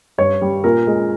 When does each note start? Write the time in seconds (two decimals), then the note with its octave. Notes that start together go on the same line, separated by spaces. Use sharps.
0.18 G2 C#5
0.42 G3
0.64 A#2 A#4
0.87 G#3